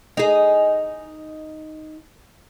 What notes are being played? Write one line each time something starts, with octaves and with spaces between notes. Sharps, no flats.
D#4 G#4